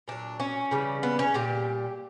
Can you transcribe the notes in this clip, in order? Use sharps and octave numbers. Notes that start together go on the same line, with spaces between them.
A#2 F#3 D4
C#4
C#3 E3 G3
B3
C#4
A#2 G3 G4